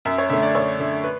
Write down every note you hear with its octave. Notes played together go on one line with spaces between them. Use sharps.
F#2 E5
C#5
D3 A3 E5
D5
F#2 C#5
D3 A3
B4